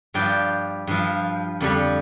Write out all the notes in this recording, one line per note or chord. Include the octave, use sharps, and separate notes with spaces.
G2 F3 D5 G5
G2 F3
F2 D3 G3